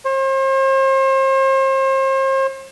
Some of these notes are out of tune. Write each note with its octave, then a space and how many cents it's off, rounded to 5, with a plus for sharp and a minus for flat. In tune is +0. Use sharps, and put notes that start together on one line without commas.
C5 +40